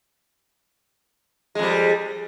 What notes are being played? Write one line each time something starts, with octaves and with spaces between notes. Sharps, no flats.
F2 G3 G#3